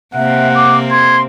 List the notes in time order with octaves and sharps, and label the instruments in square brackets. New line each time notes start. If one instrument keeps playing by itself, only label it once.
[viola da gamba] C3 A#3 C4 [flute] E5 [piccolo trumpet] F#5
[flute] D6
[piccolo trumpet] C6 [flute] G#6